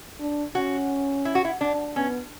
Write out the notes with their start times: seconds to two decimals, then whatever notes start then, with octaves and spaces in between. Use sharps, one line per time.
0.20 D4
0.55 C#4 F#4
1.25 E4
1.35 F#4
1.45 E4
1.61 D4
1.95 B3 C#4